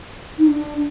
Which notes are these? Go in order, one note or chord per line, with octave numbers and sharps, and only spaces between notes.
D#4
D4